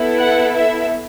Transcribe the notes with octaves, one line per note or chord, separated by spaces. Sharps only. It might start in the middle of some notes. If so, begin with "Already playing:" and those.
Already playing: B3 E4 A4
F#5
E5